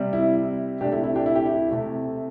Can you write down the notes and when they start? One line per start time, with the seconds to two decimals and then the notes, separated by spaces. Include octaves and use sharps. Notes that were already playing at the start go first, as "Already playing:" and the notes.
Already playing: C3 G3
0.13 E4
0.81 C3 D4 G4
0.85 A3
0.92 E4
1.04 E4
1.16 D4 G4
1.26 E4
1.36 G4
1.46 E4
1.71 C3 A3